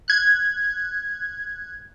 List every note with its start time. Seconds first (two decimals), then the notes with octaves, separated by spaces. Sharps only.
0.08 F#6 G#6